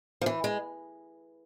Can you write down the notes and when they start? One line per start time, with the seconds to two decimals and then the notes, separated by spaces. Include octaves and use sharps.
0.21 F3
0.26 E3
0.44 G#3